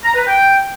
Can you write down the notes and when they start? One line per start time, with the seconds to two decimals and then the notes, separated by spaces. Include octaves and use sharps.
0.04 A#5
0.16 B4
0.27 G5